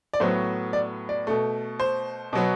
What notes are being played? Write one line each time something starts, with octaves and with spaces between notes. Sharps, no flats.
D5
A2 F#3 B3 C5
D5
D5
B2 A3
C5
B2 F#3 B3